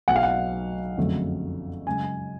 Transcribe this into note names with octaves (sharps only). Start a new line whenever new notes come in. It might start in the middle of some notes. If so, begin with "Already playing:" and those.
B1 B2 F#3 F#5
F5
F#5
F#1 F2 D3 F#3 A3
F#2 C#3 G#3 G#5